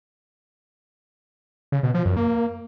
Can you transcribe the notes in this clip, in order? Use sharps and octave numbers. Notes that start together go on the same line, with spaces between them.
C#3
B2
F3
F#2
A#3